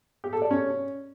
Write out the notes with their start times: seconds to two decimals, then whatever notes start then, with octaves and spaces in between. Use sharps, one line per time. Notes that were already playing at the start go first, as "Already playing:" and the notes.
0.24 G4
0.33 A4
0.42 D5
0.51 C#4